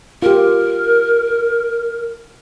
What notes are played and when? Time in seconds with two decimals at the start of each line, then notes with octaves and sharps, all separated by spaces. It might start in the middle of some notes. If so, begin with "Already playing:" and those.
0.22 F4 G4 A#4